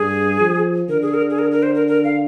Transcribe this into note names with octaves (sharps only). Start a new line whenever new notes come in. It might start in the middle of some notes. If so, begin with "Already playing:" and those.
Already playing: G2 G#4
F3
D3 A#4
G#4
A#4
G#4
A#4
A#4
C5
A#4
A#4
F5